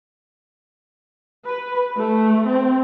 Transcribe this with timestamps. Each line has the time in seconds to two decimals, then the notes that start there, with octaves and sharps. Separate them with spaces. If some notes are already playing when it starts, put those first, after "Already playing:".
1.46 B4
1.96 A3
2.46 C4